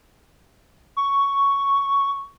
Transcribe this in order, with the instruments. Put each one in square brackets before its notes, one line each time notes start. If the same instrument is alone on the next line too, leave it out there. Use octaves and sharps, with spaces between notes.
[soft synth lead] C#6